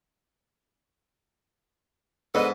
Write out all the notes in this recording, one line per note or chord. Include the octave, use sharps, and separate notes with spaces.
G#2 B3 D4 A4 B4 D#5